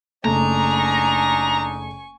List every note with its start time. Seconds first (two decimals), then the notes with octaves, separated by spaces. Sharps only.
0.25 F#1 A3 D4 D#4 G#5 A#5 C#6